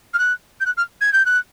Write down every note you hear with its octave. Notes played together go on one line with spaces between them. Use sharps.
F6
F#6
G6
F#6
F6
G#6
G6
F#6